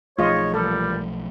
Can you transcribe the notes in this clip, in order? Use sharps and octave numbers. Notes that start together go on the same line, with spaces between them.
B1 F3 A3 D#4 F4 G#4 C#5 D#5
A#2 E3 G3 A4